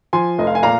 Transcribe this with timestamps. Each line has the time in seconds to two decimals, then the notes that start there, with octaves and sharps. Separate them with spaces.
0.13 F3 G#5 C6
0.38 F1 D#5
0.47 F5
0.55 G#5
0.63 A#2 F5 A#5